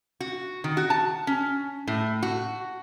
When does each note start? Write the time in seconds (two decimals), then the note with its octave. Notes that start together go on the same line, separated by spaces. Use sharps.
0.20 F#4
0.64 D#3
0.77 F#4
0.90 A5
1.27 C#4
1.88 A2
2.23 F#4